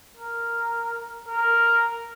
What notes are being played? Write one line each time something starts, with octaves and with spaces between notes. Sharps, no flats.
A#4
A#4